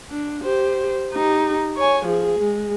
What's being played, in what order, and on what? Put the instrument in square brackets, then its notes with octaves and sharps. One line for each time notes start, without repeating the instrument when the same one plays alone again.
[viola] D4
G4 C5
D#4 G4
C#5 G#5
F3 G#4
G#3